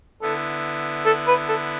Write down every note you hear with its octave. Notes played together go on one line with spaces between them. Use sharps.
D3 B3 E4 A4
A4
B4
A4